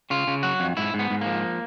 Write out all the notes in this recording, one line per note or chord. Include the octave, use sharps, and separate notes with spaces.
C#3 F4
C#3
F#3 F#4
F2
G#2 E4
G#2
B3
G#2
F3 A#3